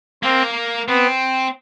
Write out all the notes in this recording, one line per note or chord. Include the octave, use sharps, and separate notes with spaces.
A#3 C4
B3 C4